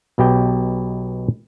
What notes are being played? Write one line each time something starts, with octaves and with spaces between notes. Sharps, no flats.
B1 B2 G4 G5